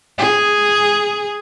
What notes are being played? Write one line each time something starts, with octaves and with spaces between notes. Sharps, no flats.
G#4